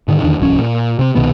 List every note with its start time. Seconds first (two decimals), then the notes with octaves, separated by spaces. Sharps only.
0.08 G#2 D3 D#3
0.23 E2 D3 D#3 D4
0.40 D1 C2 F3 C#4
0.58 A#2
0.99 C3 C4
1.15 C2 B2 D#3 B3